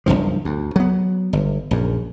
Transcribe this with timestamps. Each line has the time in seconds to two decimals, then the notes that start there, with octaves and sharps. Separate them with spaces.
0.06 F#1 B1 G2 F3
0.45 D2
0.76 F#3 B3
1.33 G1
1.71 A#1 F#2